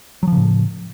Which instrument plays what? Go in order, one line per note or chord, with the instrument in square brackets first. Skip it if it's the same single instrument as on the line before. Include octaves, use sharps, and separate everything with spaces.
[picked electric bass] F#3
F3
C#3
A2